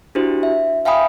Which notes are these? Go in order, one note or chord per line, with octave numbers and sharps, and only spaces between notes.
D4 E4 F#4 G4 C5
E5
E5 F5 G5 G#5 B5 D#6